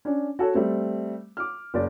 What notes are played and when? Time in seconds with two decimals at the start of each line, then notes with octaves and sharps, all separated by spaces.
0.05 C#4 D4
0.39 F#4 A4 C#5
0.54 G3 A3 C4
1.37 D6 F6
1.74 F#1 D5